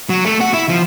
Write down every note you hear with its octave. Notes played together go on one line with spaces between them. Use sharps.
F#3
A3
F#4
E4
F3